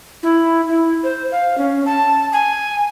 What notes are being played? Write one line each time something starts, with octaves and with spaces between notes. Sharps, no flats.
E4
E4
C5
F5
C#4
A5
G#5